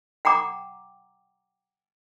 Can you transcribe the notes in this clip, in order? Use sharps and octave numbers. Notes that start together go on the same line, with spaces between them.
F#5 G5 A#5 D6